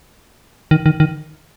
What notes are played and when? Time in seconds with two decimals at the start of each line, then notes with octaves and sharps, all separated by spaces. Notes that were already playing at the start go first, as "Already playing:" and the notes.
0.71 D#3
0.86 D#3
1.00 D#3